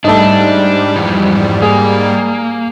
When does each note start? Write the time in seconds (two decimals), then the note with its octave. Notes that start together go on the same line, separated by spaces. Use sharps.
0.04 G#2 G3 A3 D4 D#4
0.96 F2 E3
1.62 A#3 G#4